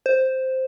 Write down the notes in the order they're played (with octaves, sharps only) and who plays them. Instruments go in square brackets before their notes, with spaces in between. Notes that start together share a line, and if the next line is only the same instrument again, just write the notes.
[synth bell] C5